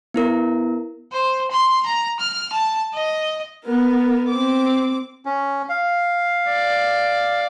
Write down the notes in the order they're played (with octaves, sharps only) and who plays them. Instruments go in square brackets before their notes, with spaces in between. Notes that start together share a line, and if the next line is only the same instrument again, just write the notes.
[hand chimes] B3 E4 A#4
[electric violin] C5
C6
A#5
F6
A5
D#5
[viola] B3 A#4
C4 D6
[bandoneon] C#4
F5
[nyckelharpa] D5